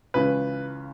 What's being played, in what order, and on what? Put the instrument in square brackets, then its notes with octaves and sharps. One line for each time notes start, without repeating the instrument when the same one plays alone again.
[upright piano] C#2 C#3 E3 [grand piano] B4